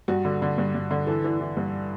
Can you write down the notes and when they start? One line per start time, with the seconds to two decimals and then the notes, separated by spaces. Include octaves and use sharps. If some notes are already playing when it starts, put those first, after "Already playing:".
0.08 G2 F#4
0.25 D3
0.42 D3
0.58 G2
0.74 G2
0.91 D3
1.07 E3 A4
1.24 E3
1.40 E3
1.57 G2